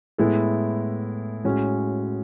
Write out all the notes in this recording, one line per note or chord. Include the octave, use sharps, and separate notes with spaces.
A2 G#3 B3 E4 A4
A2 G#3 C#4 F#4